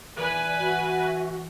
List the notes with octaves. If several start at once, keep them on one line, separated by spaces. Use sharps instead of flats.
E3 B4 D5 G#5
F#4 E5